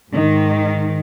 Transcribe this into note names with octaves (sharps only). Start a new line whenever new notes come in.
G#2 D#3